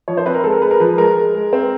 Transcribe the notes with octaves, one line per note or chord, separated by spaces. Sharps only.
F3 C#5
C5
C4 B4
A#4
G#3 A4
A#4
G#3 B4
A#4
F3 B4
G#3 A#4
G#3
G#3
C4